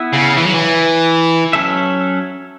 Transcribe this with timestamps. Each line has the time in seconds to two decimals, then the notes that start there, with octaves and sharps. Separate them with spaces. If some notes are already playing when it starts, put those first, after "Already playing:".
Already playing: B3 E4 B4 E5
0.13 C#3
0.37 E3
0.46 F#3
0.54 E3
1.53 F#3 C#4 A4 E5